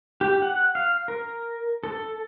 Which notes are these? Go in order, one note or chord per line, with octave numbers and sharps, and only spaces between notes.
G4
F#5
F5
A#4
A4